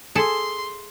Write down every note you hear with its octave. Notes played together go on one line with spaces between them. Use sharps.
G#4 A4 A5 C6